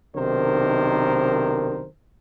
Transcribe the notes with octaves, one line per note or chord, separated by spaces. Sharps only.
B1 C3 D#3 D4 A#4 C5